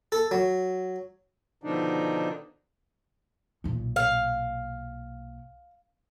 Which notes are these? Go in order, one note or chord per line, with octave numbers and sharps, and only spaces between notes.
A4
F#3
B2 D3 D#3 F3 D4 D#4
B1 A#2
F5